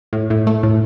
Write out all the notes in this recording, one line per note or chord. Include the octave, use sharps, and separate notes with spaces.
A2
A2
A3
A2